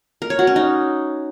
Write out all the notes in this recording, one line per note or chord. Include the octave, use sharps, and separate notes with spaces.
A#4
C#5
F#4
C#4
D#4